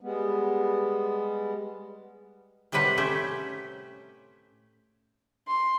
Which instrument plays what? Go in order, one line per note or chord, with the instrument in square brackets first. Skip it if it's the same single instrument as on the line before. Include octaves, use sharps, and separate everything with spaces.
[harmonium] G3 G#3 B3
[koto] A2 C3 D#3 G3 B4 F#5
A3 C#4 G4 C5
[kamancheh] C6